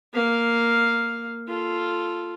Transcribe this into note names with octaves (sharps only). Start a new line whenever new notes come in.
A#3 F5
F4 A4